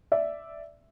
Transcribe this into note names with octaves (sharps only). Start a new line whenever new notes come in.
D5 E5